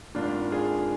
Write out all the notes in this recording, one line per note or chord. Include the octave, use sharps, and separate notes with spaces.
G#1 G#2 D#3 D4 F4
F4 G#4